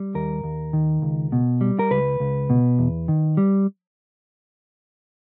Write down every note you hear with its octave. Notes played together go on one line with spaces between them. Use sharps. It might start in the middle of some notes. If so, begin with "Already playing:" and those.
Already playing: G3
D#2 A#4
D#2
D#3
C#2
B2
G3
A#4
C#2 B4
C#2
B2
E2
D#3
G3